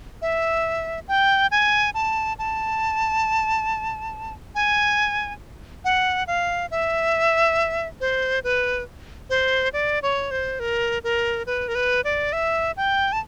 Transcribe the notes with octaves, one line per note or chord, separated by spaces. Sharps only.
E5
G5
G#5
A5
A5
G#5
F#5
F5
E5
C5
B4
C5
D5
C#5
C5
A#4
A#4
B4
A#4
B4
D5
E5
G5
A5